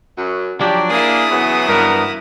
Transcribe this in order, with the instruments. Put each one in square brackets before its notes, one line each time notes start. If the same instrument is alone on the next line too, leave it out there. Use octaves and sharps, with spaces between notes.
[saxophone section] F#2 F#3
[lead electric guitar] F3 F#3 [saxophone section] D4 [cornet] G4
[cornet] A#3 [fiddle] E4 D#6 [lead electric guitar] G#4
[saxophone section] C#3 E3 F#3 [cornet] B3
[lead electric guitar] G2 B3 [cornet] A#4